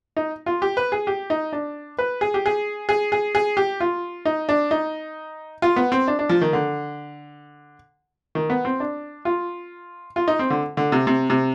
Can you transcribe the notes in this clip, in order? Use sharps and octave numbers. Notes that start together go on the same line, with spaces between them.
D#4
F4
G4
B4
G#4
G4
D#4
D4
B4
G#4
G4
G#4
G#4
G#4
G#4
G4
F4
D#4
D4
D#4
F4
B3
C4
D4
D4
F3
D#3
D3
D#3
B3
C4
D4
F4
F4
D#4
C4
D3
D3
C3
C3
C3